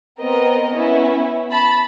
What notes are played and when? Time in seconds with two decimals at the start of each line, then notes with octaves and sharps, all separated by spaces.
0.19 B3 C4 A#4 D#5
0.72 B3 C#4 E4
1.51 A5 B5